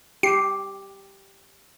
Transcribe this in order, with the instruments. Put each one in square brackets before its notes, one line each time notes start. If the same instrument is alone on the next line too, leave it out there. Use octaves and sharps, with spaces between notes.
[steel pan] G4 [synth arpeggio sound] C7